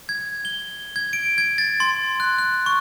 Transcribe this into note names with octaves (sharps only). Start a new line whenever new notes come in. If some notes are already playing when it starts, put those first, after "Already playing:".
G#6
G7
G#6
D7
G#6
A6
C6
F#6
F#6
C#6